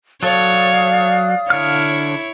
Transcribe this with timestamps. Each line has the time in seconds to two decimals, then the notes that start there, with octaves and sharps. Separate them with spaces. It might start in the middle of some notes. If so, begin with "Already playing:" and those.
0.23 F#3 A4 C#5 D5 F5 D#6
1.50 D3 E4 C#5 F6